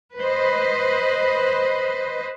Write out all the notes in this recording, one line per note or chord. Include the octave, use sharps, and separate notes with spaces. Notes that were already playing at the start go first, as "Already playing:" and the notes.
B4 C5 D#5